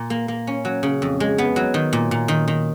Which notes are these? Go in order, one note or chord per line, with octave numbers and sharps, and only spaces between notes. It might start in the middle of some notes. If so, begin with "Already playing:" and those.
Already playing: A#2
A#3
A#3
C#4
F#3
C#3
F2
G#3
B3
F#3
D#3
A#2
A#2
D#3
D#3